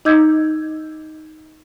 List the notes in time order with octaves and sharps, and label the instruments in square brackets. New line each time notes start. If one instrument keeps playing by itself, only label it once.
[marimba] D#4 D#5 D6 E6 G6 G#6